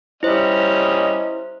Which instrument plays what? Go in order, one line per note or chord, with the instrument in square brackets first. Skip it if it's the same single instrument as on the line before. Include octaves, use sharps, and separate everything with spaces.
[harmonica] G3 C#4 D#5 [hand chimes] E4 C5